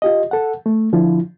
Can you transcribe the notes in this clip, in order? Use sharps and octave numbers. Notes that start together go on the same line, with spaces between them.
F4 G4 D#5
A4 F#5
A3
D3 F3 E4 F4